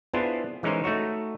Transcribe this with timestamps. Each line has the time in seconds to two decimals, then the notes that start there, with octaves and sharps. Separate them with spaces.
0.14 B3 D4 E4 F4 G#4 C5
0.63 E3 G#3 C#4 D#4 A#4 C5
0.84 A3 D#4 F#4 C#5